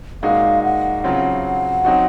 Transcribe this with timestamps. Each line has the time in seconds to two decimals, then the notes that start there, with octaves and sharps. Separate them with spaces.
0.23 A#2 G#3 D#4 F#4 F5
0.64 F#5
1.04 C#3 F#3 C4 F4 F#5
1.85 F#3 C4 D#4 F#4